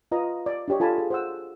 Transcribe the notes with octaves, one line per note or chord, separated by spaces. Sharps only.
F4 B4 D#5 A#5
D5
D4 F#4 G4 C#5 D#5
F4 A4 G#5 A5 B5
G#4
C5 F#5 E6